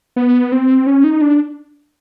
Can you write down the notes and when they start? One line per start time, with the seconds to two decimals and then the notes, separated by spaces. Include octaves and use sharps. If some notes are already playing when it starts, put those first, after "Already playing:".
0.16 B3
0.52 C4
0.87 C#4
1.04 D#4
1.21 D4